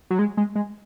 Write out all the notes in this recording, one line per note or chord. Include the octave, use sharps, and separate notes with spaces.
F#3
G#3
G#3
G#3